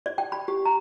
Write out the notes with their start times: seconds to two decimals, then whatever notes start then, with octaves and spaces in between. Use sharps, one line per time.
0.06 D5
0.18 G5
0.32 B5
0.48 G4
0.65 A#5